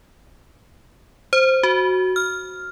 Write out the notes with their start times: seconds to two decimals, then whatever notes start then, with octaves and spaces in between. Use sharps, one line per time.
1.33 C5
1.63 F#4
2.16 F6